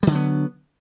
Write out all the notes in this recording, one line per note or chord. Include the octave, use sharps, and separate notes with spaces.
D3 F#3 G3 B3